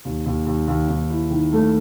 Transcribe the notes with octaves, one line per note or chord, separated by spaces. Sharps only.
D#2
D#2
D#2
D#2
D#2
E4
D#3
A3